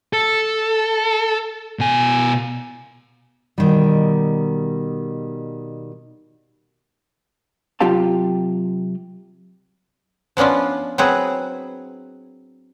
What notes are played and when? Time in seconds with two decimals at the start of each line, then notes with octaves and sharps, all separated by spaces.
0.13 A4
1.79 B2 G#5
3.58 B2 D#3 G3
7.80 C3 F#3 F4 G4 F5 A5
10.37 F3 B3 C#4 D4 F4
10.98 F#3 C4 G#4 B4